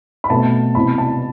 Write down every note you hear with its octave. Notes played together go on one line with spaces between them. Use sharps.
B5
B2 A3 C4 A5
E2 C3 G#3 B3 B5
A5